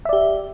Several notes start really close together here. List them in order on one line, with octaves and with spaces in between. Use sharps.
E5 D5 G4